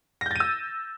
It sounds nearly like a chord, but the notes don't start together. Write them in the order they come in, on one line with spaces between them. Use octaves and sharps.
A#6 G6 A6 D#7 E6